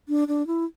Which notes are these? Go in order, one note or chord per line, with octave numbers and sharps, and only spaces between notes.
D4
D4
E4